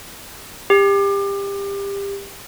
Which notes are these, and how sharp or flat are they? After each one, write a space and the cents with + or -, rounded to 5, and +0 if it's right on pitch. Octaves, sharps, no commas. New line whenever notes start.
G4 +25